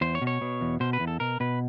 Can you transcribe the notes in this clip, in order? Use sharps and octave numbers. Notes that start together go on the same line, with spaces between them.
E2 C5
C#5
B2
C#5
B2
E2
B2 C5
B4
E2
A4
B2 A#4
B2 B4